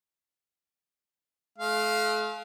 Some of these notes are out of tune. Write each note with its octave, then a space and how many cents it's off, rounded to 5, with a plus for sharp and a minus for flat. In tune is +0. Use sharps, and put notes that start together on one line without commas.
A3 -45 F5 +0